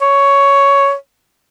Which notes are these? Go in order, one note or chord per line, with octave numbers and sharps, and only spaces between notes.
C#5